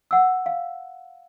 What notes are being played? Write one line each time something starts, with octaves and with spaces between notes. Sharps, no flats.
F#5 E6
F5